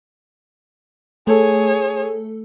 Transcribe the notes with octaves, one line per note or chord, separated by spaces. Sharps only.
A3 G#4 A4 C#5